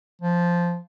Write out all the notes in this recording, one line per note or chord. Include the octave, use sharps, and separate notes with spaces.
F3